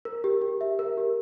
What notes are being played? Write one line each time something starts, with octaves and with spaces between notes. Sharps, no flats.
A#4
G4
G4
E5
A#4
G4